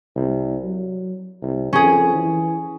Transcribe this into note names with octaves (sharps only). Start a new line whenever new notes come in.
C2
F#3
C2
F2 C#4 G#4
E3